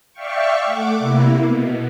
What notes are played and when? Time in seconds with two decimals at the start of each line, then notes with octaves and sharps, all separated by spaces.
0.13 D5 E5 F5 G5 C#6
0.65 A3 F#5 D6
0.99 C3 A#3 E4
1.39 B2